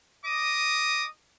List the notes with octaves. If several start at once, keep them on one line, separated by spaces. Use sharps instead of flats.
D#5 D6 D#6